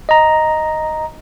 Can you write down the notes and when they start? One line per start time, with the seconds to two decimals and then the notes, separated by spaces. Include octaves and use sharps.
0.09 D#5 A#5